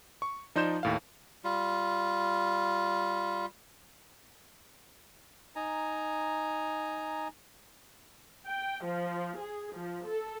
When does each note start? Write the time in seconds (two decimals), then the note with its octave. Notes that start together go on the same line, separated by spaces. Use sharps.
0.22 C#6
0.55 F3 D#4 D5 C6 G6 E7
0.83 D#2 A2 F5
1.44 G3 F4
5.56 D#4 G#5 A#5
8.46 G5
8.83 F3
9.37 G#4
9.75 F3
10.05 A4